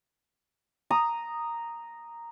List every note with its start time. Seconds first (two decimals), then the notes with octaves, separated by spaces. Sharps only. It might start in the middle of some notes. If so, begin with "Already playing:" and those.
0.90 A#5 D#6